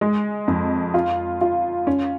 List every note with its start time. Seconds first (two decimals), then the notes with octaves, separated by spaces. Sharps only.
0.01 G#3
0.48 F2
0.94 F4
1.41 F4
1.87 C#4